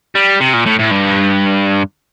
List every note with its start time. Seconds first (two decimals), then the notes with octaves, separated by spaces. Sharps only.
0.15 G3
0.40 C3
0.54 A#2
0.66 A2
0.79 A2
0.91 G2